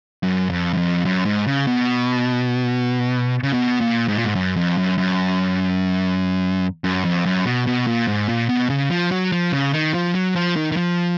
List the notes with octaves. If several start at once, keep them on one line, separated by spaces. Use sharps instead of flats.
F#2
F2
F#2
F2
F#2
G#2
C#3
B2
C#3
B2
A#2
G#2
A#2
G#2
F#2
F2
F#2
F#2
F#2
F2
F#2
B2
B2
A#2
G#2
A#2
B2
C#3
F3
F#3
F3
C#3
D#3
F3
F#3
F3
D#3
D#3
F3